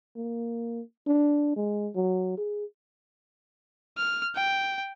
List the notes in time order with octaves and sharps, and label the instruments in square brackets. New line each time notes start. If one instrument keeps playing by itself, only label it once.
[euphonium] A#3
D4
G#3
F#3
G#4
[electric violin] F6
G5